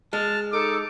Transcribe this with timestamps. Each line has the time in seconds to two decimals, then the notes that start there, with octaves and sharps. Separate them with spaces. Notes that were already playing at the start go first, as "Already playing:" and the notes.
0.13 G#3 A5 F6
0.53 D#4 A4 D6